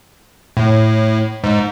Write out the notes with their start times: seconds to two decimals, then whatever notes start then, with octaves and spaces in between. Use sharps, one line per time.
0.57 A2
1.44 G#2